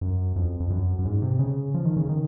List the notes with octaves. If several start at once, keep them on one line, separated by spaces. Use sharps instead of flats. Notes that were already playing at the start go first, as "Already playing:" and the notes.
F#2
F2
F2
F#2
F#2
G#2
C3
C#3
F3
D#3
C#3
D#3